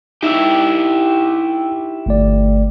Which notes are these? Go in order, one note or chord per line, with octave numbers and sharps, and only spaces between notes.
D#4 E4 G4 E6
G1 A3 D5